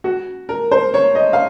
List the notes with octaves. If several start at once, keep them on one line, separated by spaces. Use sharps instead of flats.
F#4
A#4
C5
C#5
D#5
F5